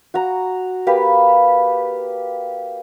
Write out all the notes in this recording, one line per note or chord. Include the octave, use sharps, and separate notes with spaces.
F#4 A#5
A#3 G4 B4